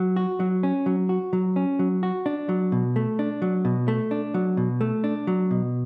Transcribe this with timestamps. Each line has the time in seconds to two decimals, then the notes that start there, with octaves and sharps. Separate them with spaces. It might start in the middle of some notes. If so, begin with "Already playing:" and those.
Already playing: F#3
0.16 F#4
0.40 F#3
0.63 C#4
0.86 F#3
1.09 F#4
1.33 F#3
1.56 C#4
1.79 F#3
2.03 F#4
2.26 D4
2.49 F#3
2.72 B2
2.96 A3
3.19 D4
3.42 F#3
3.65 B2
3.88 A3
4.11 D4
4.34 F#3
4.57 B2
4.81 A3
5.04 D4
5.27 F#3
5.51 B2